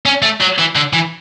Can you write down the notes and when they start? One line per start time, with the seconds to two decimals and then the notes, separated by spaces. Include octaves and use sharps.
0.06 C#4
0.22 A3
0.41 F#3
0.58 E3
0.75 D3
0.93 E3